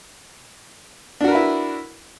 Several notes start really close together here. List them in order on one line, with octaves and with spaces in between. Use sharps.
D4 F#4 A#4 B4 E4